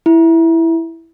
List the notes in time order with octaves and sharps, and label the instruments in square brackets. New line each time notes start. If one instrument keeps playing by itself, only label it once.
[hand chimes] E4